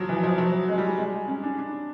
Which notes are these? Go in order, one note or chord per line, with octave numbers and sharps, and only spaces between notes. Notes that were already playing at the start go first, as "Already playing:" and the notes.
Already playing: F3 F#3
E3
F3
F#3
G#3
G3
G#3
C#4
D4
D4